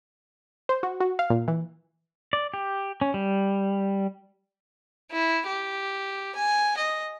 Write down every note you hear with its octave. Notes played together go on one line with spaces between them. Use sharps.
C5
F#4
F#4
F5
A#2
E3
D5
G4
C#4
G3
E4
G4
G#5
D#5